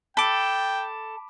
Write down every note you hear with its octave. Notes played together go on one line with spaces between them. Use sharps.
A4 G5 B5 D6